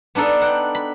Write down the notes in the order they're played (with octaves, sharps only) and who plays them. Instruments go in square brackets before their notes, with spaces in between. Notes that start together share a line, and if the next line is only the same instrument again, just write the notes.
[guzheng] B3 D4 D#4 A4
F#5 G5
B5